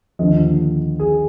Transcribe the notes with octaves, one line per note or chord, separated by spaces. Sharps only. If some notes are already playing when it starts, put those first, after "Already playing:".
D#2 D3 F3 D#5
G#4